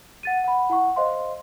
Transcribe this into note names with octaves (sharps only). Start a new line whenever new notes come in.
F#5 A6 D#7
F#5 B5
E4 F#5 C#6
C5 D#5 F5 C6